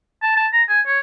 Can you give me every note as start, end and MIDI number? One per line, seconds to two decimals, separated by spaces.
0.23 0.34 81
0.37 0.46 81
0.53 0.63 82
0.69 0.81 80
0.87 0.99 73